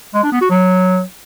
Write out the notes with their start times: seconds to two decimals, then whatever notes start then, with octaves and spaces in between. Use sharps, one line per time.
0.14 G#3
0.23 D4
0.32 B3
0.41 F#4
0.50 F#3